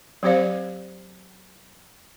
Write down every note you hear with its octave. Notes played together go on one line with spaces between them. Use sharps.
F#3 C4 G4 C5 D5 F5